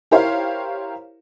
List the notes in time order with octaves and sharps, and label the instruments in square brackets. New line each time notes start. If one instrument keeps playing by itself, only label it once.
[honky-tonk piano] E4 G4 A#4 C5 C#5 F5